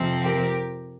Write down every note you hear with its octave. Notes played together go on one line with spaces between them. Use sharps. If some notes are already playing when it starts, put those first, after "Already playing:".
Already playing: F2 C3 F3 C4
G4 A#4